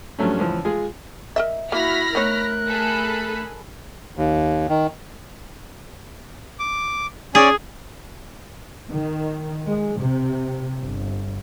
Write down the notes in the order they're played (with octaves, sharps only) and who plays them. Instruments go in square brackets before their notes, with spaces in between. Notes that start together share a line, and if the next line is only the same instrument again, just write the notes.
[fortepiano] G2 F3 F#3 A3 C#4
C#2 E3 F3
G#3 F4 G#4
[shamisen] A#4 D#5 E5
[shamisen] A#3 [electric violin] E4 F#4 [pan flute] E5 [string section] B5 F6 A#6
[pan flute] A3 [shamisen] B3 D#4 C#5 [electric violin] A#4 F#6
[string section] G#4 A4 B5
[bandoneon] D#2
D#3
[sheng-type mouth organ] D6
[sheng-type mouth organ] C#4 D5 G#5 [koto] G#4
[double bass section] D#3
G#3
C3
G1